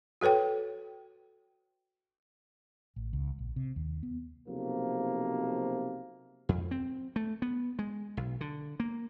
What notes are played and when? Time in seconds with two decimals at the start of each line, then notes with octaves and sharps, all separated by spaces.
0.21 F#4 A4 B4 C#5 G5
2.96 A1
3.13 C#2
3.39 A#1
3.56 C3
3.76 D#2
4.03 B3
4.48 B1 C3 F3 A#3
6.49 F2
6.71 C4
7.16 A3
7.42 B3
7.79 G#3
8.17 B1
8.41 D3
8.80 A#3